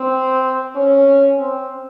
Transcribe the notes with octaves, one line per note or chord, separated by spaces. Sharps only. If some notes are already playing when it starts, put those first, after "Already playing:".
Already playing: C4
C#4
C4